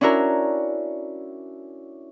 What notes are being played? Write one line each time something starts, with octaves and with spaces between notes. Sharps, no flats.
C#4 D4 E4 F#4 A#4